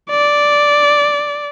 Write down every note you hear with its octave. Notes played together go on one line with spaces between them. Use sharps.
D5